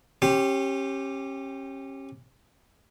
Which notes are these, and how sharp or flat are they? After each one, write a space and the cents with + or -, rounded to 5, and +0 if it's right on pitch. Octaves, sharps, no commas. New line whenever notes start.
C#4 -30 G4 +0 C6 +0